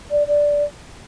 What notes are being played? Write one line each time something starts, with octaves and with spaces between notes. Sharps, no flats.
D5
D5